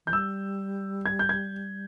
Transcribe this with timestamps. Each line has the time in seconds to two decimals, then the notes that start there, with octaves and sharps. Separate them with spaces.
0.06 E3 G6
0.12 G3 E6
1.06 G#6
1.19 G6
1.29 G#6